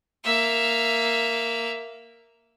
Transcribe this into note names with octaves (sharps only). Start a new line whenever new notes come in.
A#3 E5